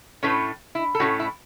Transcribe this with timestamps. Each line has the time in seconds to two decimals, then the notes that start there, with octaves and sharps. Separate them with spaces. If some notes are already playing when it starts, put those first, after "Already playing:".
0.23 A2 A3 C#4 B4
0.75 E4
0.95 A4
1.00 A2 A3 C#4 F#4
1.19 E4